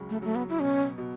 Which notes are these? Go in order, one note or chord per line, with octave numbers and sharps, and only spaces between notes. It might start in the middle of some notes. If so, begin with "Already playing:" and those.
Already playing: C#2 C#3 F#3
A3
F#3 A3
B3
E4
B2 C#4
B2